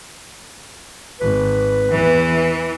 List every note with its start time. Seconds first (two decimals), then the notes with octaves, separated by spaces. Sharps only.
1.20 G#1 B4
1.92 E2 E3